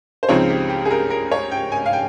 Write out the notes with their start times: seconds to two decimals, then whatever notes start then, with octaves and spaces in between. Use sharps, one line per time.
0.23 C5
0.29 C#2 C#3 F3 C4 D#4 C#5
0.49 G4
0.69 G4
0.85 G#4
0.91 A#4
1.10 A#4
1.32 C#5
1.51 G5
1.72 G#5
1.86 F5
1.93 G5